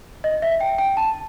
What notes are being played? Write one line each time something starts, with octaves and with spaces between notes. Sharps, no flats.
D#5
E5
G5
G5
A5